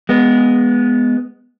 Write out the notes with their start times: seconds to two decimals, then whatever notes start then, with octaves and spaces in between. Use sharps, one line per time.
0.09 G#3 B3